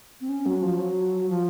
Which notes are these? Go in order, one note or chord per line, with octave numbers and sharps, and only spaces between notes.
C4
C#4
F#3
F3
F#3
F3